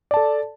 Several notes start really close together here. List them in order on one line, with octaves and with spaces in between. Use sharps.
D5 A5 A4